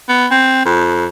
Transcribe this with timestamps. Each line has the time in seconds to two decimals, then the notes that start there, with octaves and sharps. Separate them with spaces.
0.09 B3
0.31 C4
0.65 F2